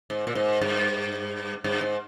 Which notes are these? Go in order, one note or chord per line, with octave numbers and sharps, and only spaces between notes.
G#2
A#2
G#2
G2
G2
G#2